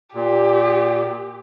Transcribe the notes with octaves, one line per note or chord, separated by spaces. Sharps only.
A#2 G4